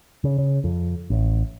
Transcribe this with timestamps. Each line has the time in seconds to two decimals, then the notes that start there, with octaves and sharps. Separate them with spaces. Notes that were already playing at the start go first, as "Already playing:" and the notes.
0.24 C#3
0.38 C#3
0.64 F2
1.10 A1